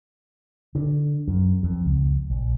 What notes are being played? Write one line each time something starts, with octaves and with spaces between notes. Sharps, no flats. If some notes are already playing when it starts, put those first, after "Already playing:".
D3
F#2
F2
C#2
A#1